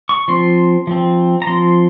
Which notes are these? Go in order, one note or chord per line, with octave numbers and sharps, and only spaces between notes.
C#6
F3 C4 C6
F3 C4
A#5
F3 C4 C6